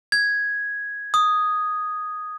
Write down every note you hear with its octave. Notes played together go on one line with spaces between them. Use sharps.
G#6
D#6